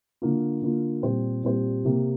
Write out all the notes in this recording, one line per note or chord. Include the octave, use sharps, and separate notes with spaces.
D3 A#3 F4
D3 A#3 F4
A#2 G3 C4 G4 C5
A#2 G3 C4 G4 C5
C3 A#3 G4